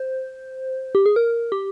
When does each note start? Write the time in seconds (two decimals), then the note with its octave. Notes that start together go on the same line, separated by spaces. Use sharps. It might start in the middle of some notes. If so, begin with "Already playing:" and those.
Already playing: C5
0.95 G4
1.06 G#4
1.16 A#4
1.52 G4